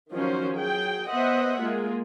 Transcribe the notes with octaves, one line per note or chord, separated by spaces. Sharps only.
D#3 F3 F#3 C#4 F#4 C5
F#3 G#4 G5
B3 C5 D#5 E5 F#5
G#3 A#3 F4 G#4